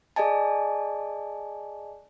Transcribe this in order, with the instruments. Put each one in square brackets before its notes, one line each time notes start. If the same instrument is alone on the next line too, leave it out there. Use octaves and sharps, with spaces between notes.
[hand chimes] G#4 D5 D#5 G#5 A5